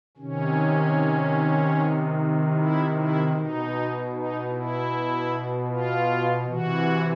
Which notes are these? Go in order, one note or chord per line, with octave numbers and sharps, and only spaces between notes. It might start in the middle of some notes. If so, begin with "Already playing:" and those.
C3 D#3 C#4
E4
E4
B2 D#4
D#4
E4
F4
C3 E3 F#4